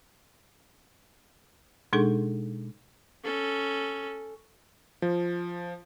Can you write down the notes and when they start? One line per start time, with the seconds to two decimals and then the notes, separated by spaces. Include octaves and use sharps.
1.93 B2 G#3 D4 D#4 G#4 A4
3.24 C#4 A4
5.02 F3